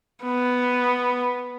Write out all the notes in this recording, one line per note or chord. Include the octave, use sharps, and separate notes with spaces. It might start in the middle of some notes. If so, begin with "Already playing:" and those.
B3